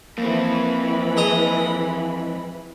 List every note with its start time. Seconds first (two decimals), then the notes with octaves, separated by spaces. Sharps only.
0.18 F2 E3 A#3 C4 B5
1.17 G#3 A#5 D#6